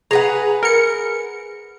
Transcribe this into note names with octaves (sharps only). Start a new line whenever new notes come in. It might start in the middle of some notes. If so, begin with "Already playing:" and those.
G#4 B4 F#5 A#5
A#4 C#7